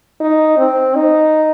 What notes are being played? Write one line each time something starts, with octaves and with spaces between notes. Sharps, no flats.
D#4
C4
D#4